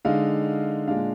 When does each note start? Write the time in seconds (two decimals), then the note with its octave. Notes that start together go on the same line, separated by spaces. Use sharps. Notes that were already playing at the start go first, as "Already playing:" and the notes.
0.05 D3 G#3 D#4 F5
0.87 A#2 G#3 D4 F5